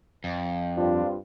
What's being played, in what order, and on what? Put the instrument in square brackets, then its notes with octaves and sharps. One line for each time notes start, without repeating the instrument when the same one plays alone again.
[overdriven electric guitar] F2
[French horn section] G2 C4 F4 [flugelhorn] D4